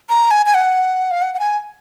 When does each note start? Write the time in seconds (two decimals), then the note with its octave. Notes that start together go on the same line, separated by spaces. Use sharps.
0.09 A#5
0.31 G#5
0.46 G#5
0.54 F#5
1.11 F5
1.22 F#5
1.34 F#5
1.39 G#5